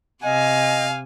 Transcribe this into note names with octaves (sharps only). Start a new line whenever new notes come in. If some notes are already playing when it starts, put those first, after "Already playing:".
C3 D#5 F5 G#5